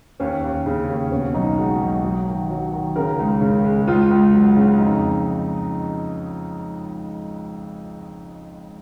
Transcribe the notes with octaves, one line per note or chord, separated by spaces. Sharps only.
D#2 C#4
D#2
C#3
D#2
B2 C#4
B1 D#4
G#3 F#4
B1
F#3
D#3
F#3
D#3
C#3 A#4
C#2
C#3
G#3
C#2 F4
C#2
F#3
C#3
F2 D#4